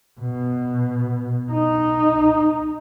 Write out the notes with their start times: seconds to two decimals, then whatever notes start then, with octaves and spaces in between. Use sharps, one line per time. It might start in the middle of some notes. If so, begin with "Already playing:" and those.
0.20 B2
1.52 D#4